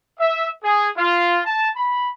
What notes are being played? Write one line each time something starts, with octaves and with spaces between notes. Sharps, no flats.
E5
G#4
F4
A5
B5